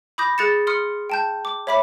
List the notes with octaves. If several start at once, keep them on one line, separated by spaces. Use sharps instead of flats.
B5 D6 D#6 G6 A#6
G#4 F#6 A6 C#7 E7
C6 D#6 F6 C#7
G5 A5 G6
D6
C#5 E5 B5 D6 B6